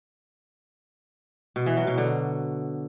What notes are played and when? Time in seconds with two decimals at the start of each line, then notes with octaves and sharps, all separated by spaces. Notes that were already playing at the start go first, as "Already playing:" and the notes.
1.56 B2
1.66 E3
1.77 F#3
1.87 B2
1.98 D3